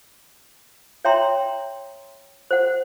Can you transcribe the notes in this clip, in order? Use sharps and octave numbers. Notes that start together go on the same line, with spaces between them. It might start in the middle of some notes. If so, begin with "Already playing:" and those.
C#5 E5 G5 A#5 C6
C5 F#5